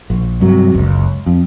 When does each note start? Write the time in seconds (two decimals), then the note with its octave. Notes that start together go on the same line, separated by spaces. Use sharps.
0.10 A#1
0.41 G2 C3 F#3
0.74 F#1 C#2
1.26 F2